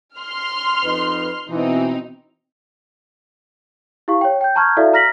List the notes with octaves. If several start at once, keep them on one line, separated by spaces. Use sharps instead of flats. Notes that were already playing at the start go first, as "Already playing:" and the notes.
C6 F6
F2 D#4 B4
B2 E3 C4 D#4
E4 G4 F5 C#6
C#5 G5
G5 G6
A5 A#5 C#6 F6 G6 G#6
E4 F#4 A4 D5 E5 F5
A#5 F6 A#6 B6 F#7